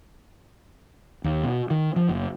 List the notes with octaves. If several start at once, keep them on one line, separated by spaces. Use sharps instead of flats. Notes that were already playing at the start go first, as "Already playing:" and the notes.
D#2
B2
D#3
F3
F#1